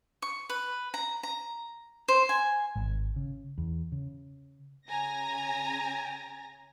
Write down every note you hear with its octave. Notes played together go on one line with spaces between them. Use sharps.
C#6
B4
A#5
A#5
C5
G#5
G#1
C#3
E2
C#3
C#3 G#5 A#5 A#6